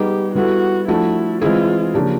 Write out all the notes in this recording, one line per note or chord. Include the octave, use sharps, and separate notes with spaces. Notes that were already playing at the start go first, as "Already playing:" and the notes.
Already playing: G3 B3 D#4 G4 G#4
G3 B3 E4 F#4 A4
F3 A3 D4 E4 F#4 A4
E3 G#3 C4 E4 F4 G#4
C#3 F3 A#3 D4 G4